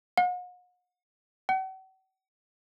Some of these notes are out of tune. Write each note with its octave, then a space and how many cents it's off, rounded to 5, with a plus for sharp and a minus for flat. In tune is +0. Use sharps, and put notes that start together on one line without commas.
F#5 -40
F#5 +45